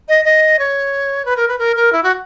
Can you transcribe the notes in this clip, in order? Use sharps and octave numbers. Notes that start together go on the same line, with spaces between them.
D#5
D#5
C#5
B4
A#4
B4
A#4
A#4
E4
F#4